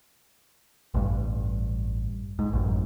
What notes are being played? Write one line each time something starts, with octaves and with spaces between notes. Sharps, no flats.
A1 G2
G#2
A1 F#2